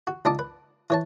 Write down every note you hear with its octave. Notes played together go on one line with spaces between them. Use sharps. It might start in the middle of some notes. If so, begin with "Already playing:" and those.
F#4
C#2 D4 D#4 A5 D6
B4
E3 C#5 A5